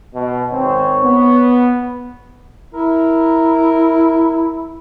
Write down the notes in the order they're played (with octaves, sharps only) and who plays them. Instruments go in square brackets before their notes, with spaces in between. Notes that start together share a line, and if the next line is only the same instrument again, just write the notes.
[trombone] B2
[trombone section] G#2 D#3 C4 [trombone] C#5
[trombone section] B3
[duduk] E4 [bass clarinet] A#4